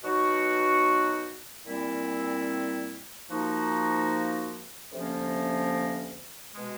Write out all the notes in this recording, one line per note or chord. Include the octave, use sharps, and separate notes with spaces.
B2 F#3 B3 D#4 F#4
A#2 G3 C4 E4
F3 A#3 D#4 F#4
D2 C3 F3 A#3 C#4
B2 G#3